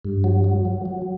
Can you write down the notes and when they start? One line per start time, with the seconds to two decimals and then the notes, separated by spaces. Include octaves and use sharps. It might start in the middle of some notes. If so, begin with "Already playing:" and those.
0.05 G2
0.24 F#3
0.44 F#3
0.65 F#3
0.85 F#3